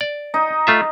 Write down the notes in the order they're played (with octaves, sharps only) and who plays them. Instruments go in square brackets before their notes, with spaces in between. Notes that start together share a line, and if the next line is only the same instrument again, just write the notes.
[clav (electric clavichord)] D5
[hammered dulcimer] D#4
[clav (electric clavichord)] A3 F4 E5